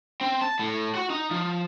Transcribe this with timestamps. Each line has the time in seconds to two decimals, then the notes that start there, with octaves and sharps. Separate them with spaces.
0.21 C4
0.42 A5
0.59 A2
0.95 F#4
1.10 D#4
1.31 F3